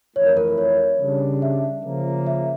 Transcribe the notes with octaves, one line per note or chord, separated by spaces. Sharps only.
F2 E3 A3 E4 C#5
A#4
A#4
A#4
C#5
C#3 G3 D4
E5
C#3 F3 A#3
E5